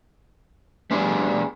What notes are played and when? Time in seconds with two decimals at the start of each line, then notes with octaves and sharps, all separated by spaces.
0.91 G3 B3 D4 G#4